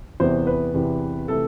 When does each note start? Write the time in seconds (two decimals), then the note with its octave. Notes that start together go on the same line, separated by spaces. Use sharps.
0.20 E2 C3 E3 B3 C5
0.47 B4
0.74 E2 C3 E3 B3
1.28 C3 E3 A3 A4